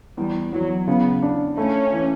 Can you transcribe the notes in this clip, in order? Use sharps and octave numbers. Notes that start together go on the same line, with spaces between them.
E2 G3
E2 F#3
C#3 B3
D4
A3 C#4
E3